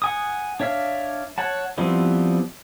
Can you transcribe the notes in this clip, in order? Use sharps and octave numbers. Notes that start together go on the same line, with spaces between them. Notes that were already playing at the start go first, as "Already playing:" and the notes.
F#5 G#5 D#6
D4 C#5 E5 F5
C#5 F#5 A5
F3 G3 B3 C4 E4